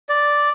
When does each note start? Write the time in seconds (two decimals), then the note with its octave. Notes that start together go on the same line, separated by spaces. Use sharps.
0.09 D5